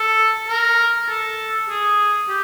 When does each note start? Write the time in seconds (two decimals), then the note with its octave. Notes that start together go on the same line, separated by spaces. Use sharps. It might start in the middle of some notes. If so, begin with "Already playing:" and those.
Already playing: A4
0.48 A#4
1.09 A4
1.69 G#4
2.29 G4